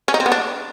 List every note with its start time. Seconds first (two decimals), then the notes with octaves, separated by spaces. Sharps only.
0.08 C#4
0.14 D#4
0.20 C4
0.26 B3
0.32 D4